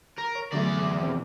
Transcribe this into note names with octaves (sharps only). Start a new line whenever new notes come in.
A#4
C#5
E2 D3 F#3 A3 D5
B2 E3 C4